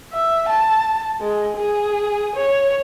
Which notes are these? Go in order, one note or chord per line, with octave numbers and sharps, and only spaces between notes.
E5
A5
G#3
G#4
C#5